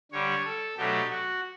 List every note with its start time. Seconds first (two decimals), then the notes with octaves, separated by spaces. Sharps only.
0.12 D3 G3 D4 C#5
0.45 A4
0.77 B2 F#3 A3 D4 G4
1.11 F#4